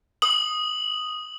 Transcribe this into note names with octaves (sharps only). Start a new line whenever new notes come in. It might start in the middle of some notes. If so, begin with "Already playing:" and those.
D#6 F#7